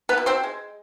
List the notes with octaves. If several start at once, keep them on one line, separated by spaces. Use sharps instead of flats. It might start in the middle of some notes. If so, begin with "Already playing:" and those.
B3 B4
B2
C4 C5
G#3